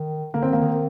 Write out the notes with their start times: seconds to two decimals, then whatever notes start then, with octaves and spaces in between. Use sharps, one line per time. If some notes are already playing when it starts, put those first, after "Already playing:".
Already playing: D#3
0.33 D3 A#3
0.42 D#3 C4
0.53 A#3
0.61 D#3